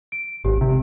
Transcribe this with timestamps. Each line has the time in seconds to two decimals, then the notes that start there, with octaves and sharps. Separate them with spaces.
0.12 D7
0.45 G#1 G4
0.61 C3